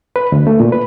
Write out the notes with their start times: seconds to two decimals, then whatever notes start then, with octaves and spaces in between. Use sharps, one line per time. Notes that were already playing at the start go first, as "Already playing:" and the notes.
0.16 B4
0.32 D2
0.47 A3
0.60 A#2
0.72 B4